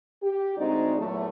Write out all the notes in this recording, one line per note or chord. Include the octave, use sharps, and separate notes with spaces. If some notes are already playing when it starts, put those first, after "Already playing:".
G4
D2 G#3 C4 D#4 F#4 D5
E2 A#2 F#3 A3